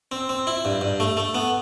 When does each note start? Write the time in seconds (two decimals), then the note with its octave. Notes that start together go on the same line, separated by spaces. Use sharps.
0.12 C4
0.29 C4
0.47 E4
0.65 G2
0.81 G2
1.00 A3
1.17 A3
1.35 B3